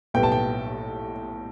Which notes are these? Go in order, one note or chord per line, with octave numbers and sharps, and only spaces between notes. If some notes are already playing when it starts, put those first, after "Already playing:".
B1 A2 G3 B3 G5
A5
G5